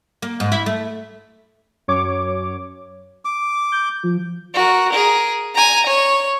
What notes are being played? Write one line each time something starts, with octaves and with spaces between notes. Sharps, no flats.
A#3
G#2
E4
A3
F#2 C#5 D6
D6
G6
F3
F#4 A#4
G#4 A#4
G#5 A#5
C#5